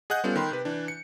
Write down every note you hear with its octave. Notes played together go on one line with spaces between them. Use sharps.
G#4 D#5 F#5 F#6 G6
G3 B3 C#4 F4 A4
D#3 G5 B5 C6
C3 B4
E3 D4
C#7